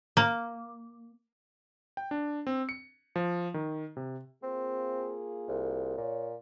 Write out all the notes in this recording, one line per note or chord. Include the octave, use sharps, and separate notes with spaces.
A#3
G5
D4
C4
C#7
F3
D#3
C3
A#3 C4 F4 G#4
C2
A#2 C#5